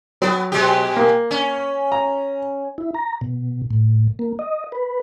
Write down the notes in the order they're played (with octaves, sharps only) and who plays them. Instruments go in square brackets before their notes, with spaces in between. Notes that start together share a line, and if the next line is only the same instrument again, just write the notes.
[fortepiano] F#3 [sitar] B3
[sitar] B2 G#3 G4
[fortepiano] A#3
[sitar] C#4
[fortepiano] A#5
[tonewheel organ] E4
A#5
B2
A2
A#3
D#5
B4